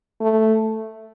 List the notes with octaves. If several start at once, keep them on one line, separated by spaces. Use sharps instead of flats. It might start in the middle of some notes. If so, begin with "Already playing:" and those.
A3